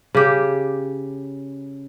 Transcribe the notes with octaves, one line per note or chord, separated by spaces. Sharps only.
C#3 G4